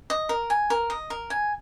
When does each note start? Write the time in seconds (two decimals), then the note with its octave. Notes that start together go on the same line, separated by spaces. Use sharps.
0.10 D#5
0.29 A#4
0.50 G#5
0.70 A#4
0.90 D#5
1.10 A#4
1.30 G#5